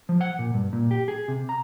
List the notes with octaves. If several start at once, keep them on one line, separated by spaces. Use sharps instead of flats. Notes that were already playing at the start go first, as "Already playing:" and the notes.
F3
F#5
A#2
G2
A#2
G4
G#4
C3
A#5